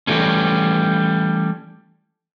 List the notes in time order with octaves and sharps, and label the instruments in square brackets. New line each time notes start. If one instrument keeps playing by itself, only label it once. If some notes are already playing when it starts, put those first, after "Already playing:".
[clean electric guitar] E3 F3 G3 A3 C#4